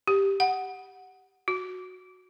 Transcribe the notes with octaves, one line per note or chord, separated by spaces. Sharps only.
G4
F#5
F#4